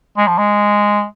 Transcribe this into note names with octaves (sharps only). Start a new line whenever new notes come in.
G#3
F3
G#3